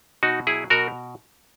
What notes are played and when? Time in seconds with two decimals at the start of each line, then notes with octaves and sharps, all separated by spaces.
0.23 B2 D#4 F#4
0.47 F#3 E4 G#4
0.70 B2 F#4 A#4